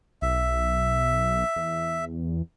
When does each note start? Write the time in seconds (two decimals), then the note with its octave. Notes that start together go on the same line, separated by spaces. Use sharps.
0.22 B1 E5
1.56 E2